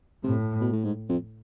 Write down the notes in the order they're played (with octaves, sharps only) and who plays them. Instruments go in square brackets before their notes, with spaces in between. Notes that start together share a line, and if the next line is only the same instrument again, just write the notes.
[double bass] A2 [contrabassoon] C3
[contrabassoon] B2
A2
G#2
F2